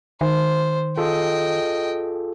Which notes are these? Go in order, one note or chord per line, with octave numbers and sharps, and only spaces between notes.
D#3 C5
F4 G#4 A4 D#5 G5